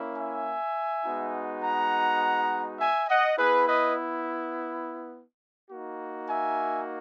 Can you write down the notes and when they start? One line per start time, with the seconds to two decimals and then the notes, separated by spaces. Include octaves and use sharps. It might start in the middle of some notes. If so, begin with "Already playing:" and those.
Already playing: A#3 C#4 E4
0.17 E5 G#5
1.04 G#3 B3 D#4 F#4
1.63 F#5 A#5
2.79 E5 G#5
3.08 D#5 F#5
3.37 B3 E4 G#4 B4
3.67 B4 D#5
5.71 A#3 D#4 F#4
6.29 E5 G#5